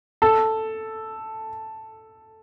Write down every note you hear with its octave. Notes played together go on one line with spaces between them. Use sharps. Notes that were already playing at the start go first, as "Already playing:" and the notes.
A4